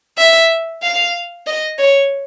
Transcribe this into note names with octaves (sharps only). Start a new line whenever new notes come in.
E5
F5
D#5
C#5